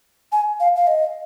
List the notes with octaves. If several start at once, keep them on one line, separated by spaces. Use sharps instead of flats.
G#5
F5
F5
D#5